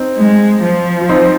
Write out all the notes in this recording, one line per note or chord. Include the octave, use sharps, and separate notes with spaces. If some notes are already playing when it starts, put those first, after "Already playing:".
Already playing: C4 D#4
G#3
F3
F4
C4 D#4